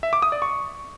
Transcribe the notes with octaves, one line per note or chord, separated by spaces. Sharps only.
E5
D6
D#6
D5
C#6